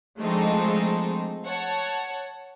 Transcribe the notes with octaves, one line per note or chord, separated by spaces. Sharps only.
F3 G#3 A3 C4 D4 D#4
C#5 F#5 A5